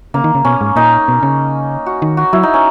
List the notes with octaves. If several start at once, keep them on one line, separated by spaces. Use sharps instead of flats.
C#3 A#3
D#3
C#3
B2 C#4
G#2
A#2 D#4
B2
C#3
F#4
D#3
F#4
F#3 E4
D#4
C#4